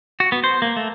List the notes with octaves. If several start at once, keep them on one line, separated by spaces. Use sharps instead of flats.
F#4
B3
C5
A#3
A3